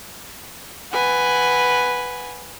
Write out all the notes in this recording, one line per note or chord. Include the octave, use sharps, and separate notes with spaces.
B4 F#5 G#5